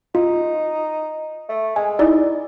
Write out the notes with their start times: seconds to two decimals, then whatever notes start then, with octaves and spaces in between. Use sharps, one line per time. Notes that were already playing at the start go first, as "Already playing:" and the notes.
0.15 D#4 F4
1.49 A3
1.76 G#3 G#5
1.99 D#4 E4 D5